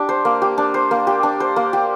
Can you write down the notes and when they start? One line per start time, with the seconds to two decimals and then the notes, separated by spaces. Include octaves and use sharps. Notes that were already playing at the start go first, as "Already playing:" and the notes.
Already playing: D4 G4
0.09 C5
0.25 A#3
0.42 G4
0.58 D4
0.74 C5
0.91 A#3
1.07 G4
1.23 D4
1.40 C5
1.56 A#3
1.73 G4